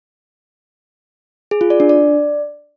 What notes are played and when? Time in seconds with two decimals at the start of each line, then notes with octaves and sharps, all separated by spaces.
1.51 G#4
1.61 F4
1.70 D5
1.80 D4
1.89 D5